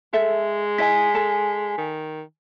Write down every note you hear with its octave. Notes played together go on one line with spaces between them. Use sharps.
G#3 A4 E5
E4 D#5 G#5 B6
A4 A5
D#3